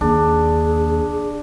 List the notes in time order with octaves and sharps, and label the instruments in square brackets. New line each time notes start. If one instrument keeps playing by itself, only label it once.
[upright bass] D#2 [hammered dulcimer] D4 [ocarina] G#4